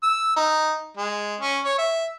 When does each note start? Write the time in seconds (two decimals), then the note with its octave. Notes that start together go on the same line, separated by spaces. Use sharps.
0.03 E6
0.36 D#4
0.97 G#3
1.41 C#4
1.64 C#5
1.78 E5